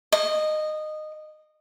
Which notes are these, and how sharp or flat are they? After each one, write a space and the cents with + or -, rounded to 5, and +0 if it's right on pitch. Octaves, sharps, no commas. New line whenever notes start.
D#5 -15